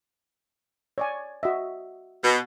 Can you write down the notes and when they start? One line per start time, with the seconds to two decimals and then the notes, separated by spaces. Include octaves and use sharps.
0.98 C#5 D5 G#5
1.43 F#4 D#5 E5
2.24 B2